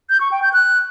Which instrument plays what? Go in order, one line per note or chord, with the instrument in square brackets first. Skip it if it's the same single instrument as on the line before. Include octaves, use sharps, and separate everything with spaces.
[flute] G6
C#6
G5
G6
F#6